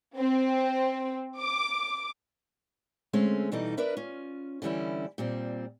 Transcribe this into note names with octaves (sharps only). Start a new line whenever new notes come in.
C4
D6
D3 G#3 A3 C4 C#4
B2 E3 G3 D4 D#4 A4
D4 A#4 B4 E5
C#4 F4
D3 E3 G3 C#4 E4
A#2 G3 C4